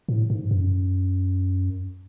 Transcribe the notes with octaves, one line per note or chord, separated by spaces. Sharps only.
A2
G#2
F#2